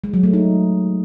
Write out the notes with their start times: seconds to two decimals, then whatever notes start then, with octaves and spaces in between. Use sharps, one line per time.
0.04 G#3
0.14 F#3
0.23 A3
0.33 D#4